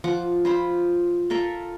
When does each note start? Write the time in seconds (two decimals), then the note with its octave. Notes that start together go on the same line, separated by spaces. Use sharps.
0.04 F3 F#5 D6
0.45 F4 C5 B5
1.30 F4 A4 A#4 E5